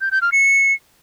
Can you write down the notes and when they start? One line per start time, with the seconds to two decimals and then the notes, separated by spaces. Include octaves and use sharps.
0.01 G6
0.12 G6
0.22 F6
0.32 C#7